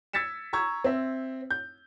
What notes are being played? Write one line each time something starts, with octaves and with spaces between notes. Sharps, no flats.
E6 G#6 A6 B6 C#7 E7
A#5 C#6 E6 G#6
C4 E5
G6